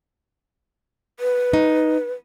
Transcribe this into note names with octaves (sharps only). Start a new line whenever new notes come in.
B4
D#4